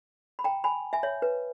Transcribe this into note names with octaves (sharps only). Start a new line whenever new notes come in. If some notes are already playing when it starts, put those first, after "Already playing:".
B5
G5 A#5
G#5 B5
E5 G#5
C#5 E5
B4